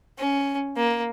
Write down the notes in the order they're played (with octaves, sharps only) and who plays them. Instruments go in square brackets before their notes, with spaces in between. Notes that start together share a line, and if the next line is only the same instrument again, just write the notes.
[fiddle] C#4
A#3